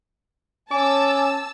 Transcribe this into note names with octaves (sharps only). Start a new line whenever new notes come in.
C#4 G#5 A5 D6 E6